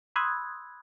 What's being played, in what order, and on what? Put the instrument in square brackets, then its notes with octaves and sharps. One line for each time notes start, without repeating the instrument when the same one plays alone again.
[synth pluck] B5 C6 D#6 E6 F#6 G#6